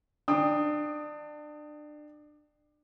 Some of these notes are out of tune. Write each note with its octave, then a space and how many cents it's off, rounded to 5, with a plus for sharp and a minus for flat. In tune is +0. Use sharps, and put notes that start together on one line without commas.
D4 +30 G5 +15 D#6 +0